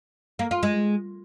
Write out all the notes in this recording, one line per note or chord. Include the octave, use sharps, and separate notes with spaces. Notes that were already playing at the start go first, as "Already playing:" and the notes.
A#3
F4
G#3